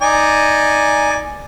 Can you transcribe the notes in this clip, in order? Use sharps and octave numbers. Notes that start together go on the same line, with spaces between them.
D#4 D5 G#5